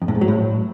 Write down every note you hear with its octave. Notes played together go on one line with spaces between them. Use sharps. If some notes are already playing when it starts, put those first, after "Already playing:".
F2
A2
G#2
F#3
A2